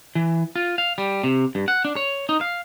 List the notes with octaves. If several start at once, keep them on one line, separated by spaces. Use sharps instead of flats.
E3
F4
F5
G3
C3
G2
F#5
D4
C#5
D#4
F5